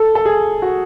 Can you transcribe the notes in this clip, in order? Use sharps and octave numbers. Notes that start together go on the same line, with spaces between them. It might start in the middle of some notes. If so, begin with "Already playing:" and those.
Already playing: A4
A4
G#4
F#4